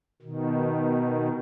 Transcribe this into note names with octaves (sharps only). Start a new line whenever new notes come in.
B2 D#3